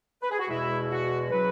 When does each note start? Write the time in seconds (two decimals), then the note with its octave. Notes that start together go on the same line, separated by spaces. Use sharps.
0.22 B4
0.31 G#4
0.39 F#4
0.48 E2 B2 G#3 E4
0.90 F#4
1.30 C#3 F#3 B4